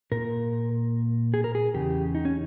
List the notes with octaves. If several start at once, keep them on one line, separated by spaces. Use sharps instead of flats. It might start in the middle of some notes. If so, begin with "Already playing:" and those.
A#2 A#4
G#4
A#4
G#4
E2 C#3 G4
D#4
C#4